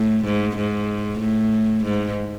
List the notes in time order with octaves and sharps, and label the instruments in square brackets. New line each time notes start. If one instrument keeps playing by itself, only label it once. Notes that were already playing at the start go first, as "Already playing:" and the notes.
Already playing: [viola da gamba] A2
G#2
G#2
A2
G#2